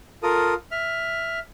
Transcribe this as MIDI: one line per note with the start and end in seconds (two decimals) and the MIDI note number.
0.23 0.54 65
0.23 0.54 69
0.23 0.54 70
0.23 0.54 87
0.71 1.39 76
0.71 1.39 89